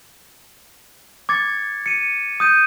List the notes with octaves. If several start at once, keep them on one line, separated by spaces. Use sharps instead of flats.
D6 G#6 A6 C#7
C#7 D#7
D#6 G6 D#7